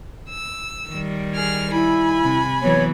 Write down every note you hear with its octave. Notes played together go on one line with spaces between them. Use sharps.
E6
D#3 G3
G#4 F6
E4 G#5 B5
C3
E3 F#3 B3 C#5